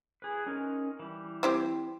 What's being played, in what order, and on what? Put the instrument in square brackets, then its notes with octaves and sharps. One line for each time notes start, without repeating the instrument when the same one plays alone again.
[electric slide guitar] G#4 B4
C#4 D#4 A#4
E3 G3
[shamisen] C4 E4 G4